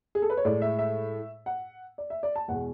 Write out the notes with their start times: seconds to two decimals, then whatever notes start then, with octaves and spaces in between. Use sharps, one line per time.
0.15 G#4
0.22 A4
0.30 B4
0.37 C#5
0.45 A2 G#3 D5
0.62 E5
0.79 E5
1.46 F#5
1.98 D5
2.10 E5
2.23 D5
2.36 A5
2.48 E2 B2 G#3 F#5